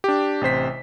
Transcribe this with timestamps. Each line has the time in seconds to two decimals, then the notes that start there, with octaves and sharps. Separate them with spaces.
0.04 D4 G4
0.41 A1 C3 C5 B6